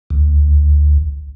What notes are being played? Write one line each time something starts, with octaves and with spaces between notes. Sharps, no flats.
D2